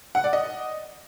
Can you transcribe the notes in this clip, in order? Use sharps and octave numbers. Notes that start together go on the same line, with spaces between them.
F#5
D5
D#5